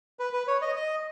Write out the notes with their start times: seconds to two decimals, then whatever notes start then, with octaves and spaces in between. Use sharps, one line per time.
0.19 B4
0.33 B4
0.47 C#5
0.62 D#5
0.76 D#5